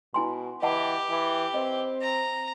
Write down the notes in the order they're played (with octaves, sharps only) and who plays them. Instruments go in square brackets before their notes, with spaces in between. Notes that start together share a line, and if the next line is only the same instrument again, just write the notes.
[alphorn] B2 [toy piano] E4 G#5 C6
[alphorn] E3 [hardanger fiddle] G4 [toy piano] D#5 F#5 A5
[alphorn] E3
[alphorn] C4 [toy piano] D#5
[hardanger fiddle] A#5